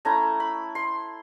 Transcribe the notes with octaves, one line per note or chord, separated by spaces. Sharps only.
A3 C#4 E4 A#5
B5
C6